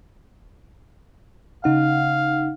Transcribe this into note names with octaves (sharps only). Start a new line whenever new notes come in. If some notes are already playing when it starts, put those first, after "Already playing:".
C#3 D#4 F5 F#5